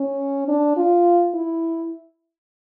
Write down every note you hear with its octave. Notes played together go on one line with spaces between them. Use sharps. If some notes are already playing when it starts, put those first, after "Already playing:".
Already playing: C#4
D4
F4
E4